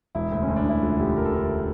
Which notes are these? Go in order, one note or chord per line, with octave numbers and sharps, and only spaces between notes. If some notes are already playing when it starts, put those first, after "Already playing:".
E1 E4
D2
C#4
D2
D4
E1 E4
D3 F4
E1 G4
E1 A#4
A4
D3 A#4